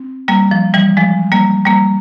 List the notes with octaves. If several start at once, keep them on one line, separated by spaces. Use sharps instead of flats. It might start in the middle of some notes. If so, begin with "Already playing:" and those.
Already playing: C4
G3 A#3
F3
E3 G3
F3 G#3
G3 A#3
G3 A#3